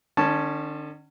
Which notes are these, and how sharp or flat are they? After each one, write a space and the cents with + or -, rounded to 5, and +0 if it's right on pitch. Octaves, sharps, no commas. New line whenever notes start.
D3 +45 C#4 +0 A5 +0